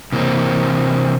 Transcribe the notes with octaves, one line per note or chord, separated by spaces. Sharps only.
C3 E3 A#3 C4